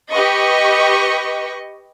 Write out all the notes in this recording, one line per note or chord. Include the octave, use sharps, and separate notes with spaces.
G4 B4 D#5 C#6